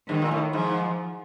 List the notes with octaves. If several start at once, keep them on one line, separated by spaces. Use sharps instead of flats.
G2 D#3
A#2
A2
G#2 F3